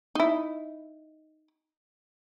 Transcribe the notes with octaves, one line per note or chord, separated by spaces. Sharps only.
D#4 E4